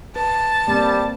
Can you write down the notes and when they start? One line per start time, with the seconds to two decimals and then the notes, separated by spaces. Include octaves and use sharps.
0.16 B4 A5
0.68 G3 A#3 C4